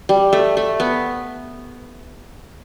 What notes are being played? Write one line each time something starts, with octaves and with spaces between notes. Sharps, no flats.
G3
A3
A3
B3